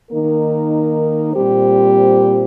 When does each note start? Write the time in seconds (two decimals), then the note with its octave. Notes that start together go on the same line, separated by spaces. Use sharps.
0.11 D#3 A#3 D#4 A#4
1.33 A#2 G3 C4 G4 C5